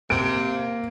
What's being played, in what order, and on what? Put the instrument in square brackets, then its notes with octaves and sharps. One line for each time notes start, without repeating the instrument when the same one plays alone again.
[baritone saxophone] C3 [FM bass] A#3 [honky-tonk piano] D7